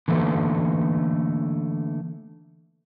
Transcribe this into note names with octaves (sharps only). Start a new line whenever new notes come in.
D3 E3 A3 A#3